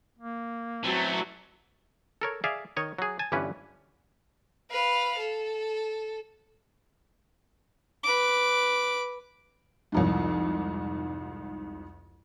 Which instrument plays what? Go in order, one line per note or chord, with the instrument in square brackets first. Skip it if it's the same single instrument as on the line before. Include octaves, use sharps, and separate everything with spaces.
[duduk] A#3
[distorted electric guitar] E3 A3 [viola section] F#3 [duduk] C4
[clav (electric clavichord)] A4 A#4 C#5
G#4 D5 E5 F5
D#3 C#5 D#5
F#3 G#4
G#5 A5
G1 G2 D3 E3 C#4 B4
[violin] B4 F5
A4
[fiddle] B4 D6
[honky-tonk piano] C2 F2 G#2